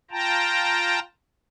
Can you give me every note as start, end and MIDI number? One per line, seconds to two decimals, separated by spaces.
0.11 0.99 65
0.11 0.99 79
0.11 0.99 81
0.11 0.99 82